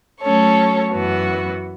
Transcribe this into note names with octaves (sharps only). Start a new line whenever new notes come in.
F#3 A3 C#4 A4 C#5
F#2 E3 B3 F#4